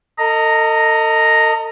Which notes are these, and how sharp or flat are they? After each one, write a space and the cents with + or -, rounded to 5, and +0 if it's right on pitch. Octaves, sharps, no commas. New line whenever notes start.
A4 +40 D#5 +0 A#5 +0